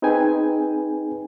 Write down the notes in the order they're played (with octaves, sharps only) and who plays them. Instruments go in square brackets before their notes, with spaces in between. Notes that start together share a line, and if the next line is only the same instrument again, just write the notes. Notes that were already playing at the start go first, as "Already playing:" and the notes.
[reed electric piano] C4 D#4 G#4 B4 G5 G#5